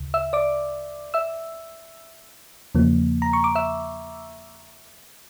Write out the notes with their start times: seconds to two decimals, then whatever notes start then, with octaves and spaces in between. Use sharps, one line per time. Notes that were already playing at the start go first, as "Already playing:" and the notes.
Already playing: D2 C#3
0.14 E5 E6
0.33 D5 D6
1.14 E5 E6
2.75 E2 C#3 F3 A#3
3.22 A#5
3.33 C#6
3.44 D6
3.55 E5 E6